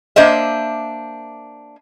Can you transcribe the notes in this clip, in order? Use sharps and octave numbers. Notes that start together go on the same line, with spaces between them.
A#3 D4 C5 D#5 E5